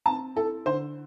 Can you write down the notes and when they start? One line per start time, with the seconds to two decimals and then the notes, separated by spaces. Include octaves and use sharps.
0.06 C4 A5
0.36 E4 A4
0.66 D3 C5